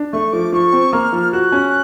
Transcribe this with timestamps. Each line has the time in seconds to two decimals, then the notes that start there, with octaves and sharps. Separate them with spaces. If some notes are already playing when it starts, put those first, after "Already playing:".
Already playing: D4
0.13 A3 C#6
0.33 F3 D6
0.53 F3 C#6
0.73 C4
0.93 A#3 F6
1.13 F3
1.32 F#4 F#6
1.52 C#4